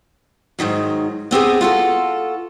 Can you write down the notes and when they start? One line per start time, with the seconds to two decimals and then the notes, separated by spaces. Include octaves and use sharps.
0.59 G#2 B2 D#3 F#3
1.31 B3 C4 G4 G#4
1.61 F4 F#4 A4